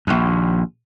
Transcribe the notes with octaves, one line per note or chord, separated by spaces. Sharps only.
A#1 D#2